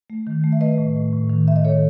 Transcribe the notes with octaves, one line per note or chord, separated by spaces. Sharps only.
A3
D#3
A3
E5
A3 B4 D#5
A2
A2
A2
D#3
D#3 E5
D#5
D#3 A4 C#5